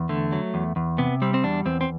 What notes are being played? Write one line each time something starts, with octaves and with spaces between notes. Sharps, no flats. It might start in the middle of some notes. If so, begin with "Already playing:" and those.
Already playing: E2
D3 A3
F#3
E2
E2
C3 B3
G3 C4
C4
E2 D4
E2 C4
C4